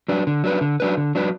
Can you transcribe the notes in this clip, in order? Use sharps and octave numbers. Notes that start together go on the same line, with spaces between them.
F#3 D4 B4
D3
F#3 D4 B4
D3
F#3 D4 B4
D3
F#3 D4 B4